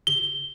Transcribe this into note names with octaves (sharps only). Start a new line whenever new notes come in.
G7